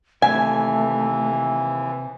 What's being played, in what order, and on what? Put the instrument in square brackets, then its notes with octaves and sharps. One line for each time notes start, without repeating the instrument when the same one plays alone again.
[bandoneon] D#2 E3 [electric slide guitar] C3 E5 [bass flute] A3 [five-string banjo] G#5